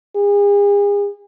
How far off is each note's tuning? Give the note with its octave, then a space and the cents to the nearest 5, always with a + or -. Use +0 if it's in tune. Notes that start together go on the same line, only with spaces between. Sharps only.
G#4 -40